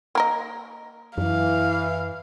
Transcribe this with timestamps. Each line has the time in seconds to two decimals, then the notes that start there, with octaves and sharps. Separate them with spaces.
0.15 A#3 A#4 D#5
1.18 F#2 E3 F5